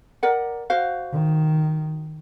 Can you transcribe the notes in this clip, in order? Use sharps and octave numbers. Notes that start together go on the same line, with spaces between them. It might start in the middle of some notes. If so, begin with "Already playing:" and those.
A#4 D5 F#5
F#4 C5 F5
D#3